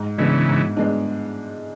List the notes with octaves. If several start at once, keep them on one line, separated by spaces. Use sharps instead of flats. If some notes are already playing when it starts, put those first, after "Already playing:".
Already playing: G#2
C#3 E3 G#3 B3 D4
G#2
G#3 B3 D4